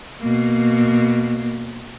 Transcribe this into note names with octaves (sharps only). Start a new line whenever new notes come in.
B2 A#3